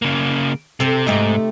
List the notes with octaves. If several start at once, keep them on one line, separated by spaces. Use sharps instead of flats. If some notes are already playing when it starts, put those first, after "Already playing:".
C#3 A#3
C3 C4 A4
G#2 C3 A3 D#4